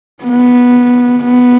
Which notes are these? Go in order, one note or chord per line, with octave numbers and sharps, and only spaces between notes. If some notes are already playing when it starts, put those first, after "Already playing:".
B3
B3